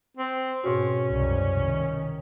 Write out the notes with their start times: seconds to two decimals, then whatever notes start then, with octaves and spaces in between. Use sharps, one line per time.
0.17 C4
0.64 G#2 B2 C#4 F#4
1.11 C2 F#2
1.64 D#3